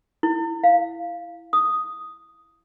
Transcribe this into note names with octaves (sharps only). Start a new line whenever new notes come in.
E4
F5
D#6